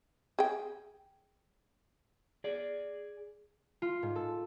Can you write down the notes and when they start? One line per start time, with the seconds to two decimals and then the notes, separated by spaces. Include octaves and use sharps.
0.39 G#4 G5
2.44 G#4 D5
3.82 F4
4.03 G#2
4.16 A4